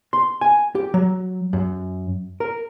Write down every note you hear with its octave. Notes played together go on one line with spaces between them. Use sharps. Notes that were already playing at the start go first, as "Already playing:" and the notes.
C6
G#5
G4
F#3
F#2
A#4